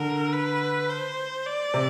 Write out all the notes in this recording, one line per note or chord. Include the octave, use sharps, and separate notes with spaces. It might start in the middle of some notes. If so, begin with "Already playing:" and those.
Already playing: D3 A#4
B4
C5
D5
C3